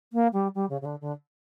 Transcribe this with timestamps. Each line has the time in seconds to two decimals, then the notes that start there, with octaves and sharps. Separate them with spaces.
0.13 A#3
0.33 G3
0.55 G3
0.70 C#3
0.81 C#3
0.85 D3
1.01 D3